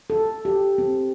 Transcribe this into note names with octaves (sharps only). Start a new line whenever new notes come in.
A4
G4
C4